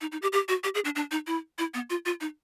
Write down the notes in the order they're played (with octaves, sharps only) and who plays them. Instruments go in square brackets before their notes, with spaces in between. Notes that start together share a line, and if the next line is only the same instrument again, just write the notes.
[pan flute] D#4
D#4
G4
G4
F#4
G4
G#4
D4
D4
D#4
E4
E4
B3
F4
F4
D#4